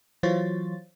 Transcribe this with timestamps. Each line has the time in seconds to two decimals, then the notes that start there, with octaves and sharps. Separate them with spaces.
0.23 E3 F#3 F4 C5 C#5 A6